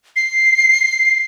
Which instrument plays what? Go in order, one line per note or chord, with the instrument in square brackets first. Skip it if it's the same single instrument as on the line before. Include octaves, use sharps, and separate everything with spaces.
[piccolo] C7